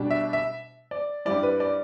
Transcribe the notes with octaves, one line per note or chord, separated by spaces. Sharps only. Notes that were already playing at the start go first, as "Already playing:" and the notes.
Already playing: B2 G3 D4
E5
E5
D5
G2 G3 E4 D5
B4
D5